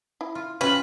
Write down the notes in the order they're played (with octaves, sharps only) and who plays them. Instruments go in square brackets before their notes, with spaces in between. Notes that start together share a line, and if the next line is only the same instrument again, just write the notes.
[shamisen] E4
[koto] F4
[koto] C#4 F4 [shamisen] F#4 G5 [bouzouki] B4